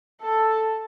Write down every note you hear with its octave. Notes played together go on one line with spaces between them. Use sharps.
A4